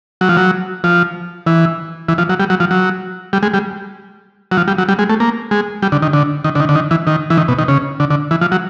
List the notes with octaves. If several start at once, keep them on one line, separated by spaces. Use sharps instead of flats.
F#3
F3
F#3
F3
E3
E3
F3
F#3
G3
F#3
F3
F#3
G3
G#3
G3
F#3
F3
G3
F#3
G3
G#3
A3
A#3
G#3
G3
D3
D#3
D3
D#3
D3
D#3
D3
D#3
E3
D#3
E3
D#3
B2
D#3
C#3
D3
D3
E3
F3
F#3